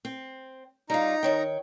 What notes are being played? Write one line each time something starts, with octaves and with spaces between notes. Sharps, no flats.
C4
G3 D#4 F4 A#5
D#3 C#5 G5